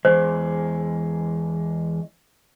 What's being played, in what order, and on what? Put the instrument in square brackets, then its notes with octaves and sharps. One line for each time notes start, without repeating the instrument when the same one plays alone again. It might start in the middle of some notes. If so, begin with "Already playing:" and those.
[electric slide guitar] E2 G#3 [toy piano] C5